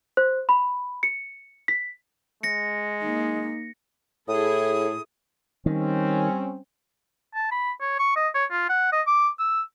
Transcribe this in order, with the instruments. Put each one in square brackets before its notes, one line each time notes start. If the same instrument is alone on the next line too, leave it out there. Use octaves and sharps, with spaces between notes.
[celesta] C5
B5
C#7
B6
[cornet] G#3 [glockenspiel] A#6 C#7
[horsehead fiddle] A#3 D#4
[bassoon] A2 [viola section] E4 G#4 A4 [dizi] D#6
[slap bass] D#3 [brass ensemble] G3 C4 C#4
[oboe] A5
B5
C#5
C#6
D#5
C#5
F4
F#5
D#5
D6
E6